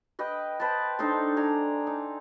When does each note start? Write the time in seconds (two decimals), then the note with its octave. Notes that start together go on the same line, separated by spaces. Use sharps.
0.19 B4 D#5 G5
0.60 B4 C5 G5 A5
0.99 D4 D#4 A4 C5
1.36 D5 G#5 A#5
1.87 D#4